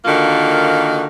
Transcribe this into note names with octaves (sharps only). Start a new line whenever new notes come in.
D3 D#3 A#3 F4 F#4